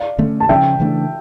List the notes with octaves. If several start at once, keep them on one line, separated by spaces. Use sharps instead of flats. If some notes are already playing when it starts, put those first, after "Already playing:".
Already playing: D5 F5
D3 A3 C#4
A5
C#3 F3 C#4 E5 G5
C#3 E3 A3 D4